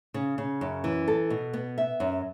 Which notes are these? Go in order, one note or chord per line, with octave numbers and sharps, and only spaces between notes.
C#3
C#3
F#2
E3
A4
B2
B3
E5
F#2